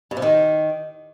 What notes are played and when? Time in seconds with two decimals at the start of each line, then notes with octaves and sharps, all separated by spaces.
0.11 G2
0.17 C3
0.22 D#3